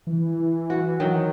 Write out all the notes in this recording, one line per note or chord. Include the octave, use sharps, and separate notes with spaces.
E3
F#4
D#3 F#3